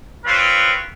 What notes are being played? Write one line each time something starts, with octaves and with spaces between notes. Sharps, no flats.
C4 F4 B4 C#5